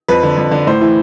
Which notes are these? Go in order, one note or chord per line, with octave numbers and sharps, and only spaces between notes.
F2 B4
D3
F2
D3
A2 C5
E3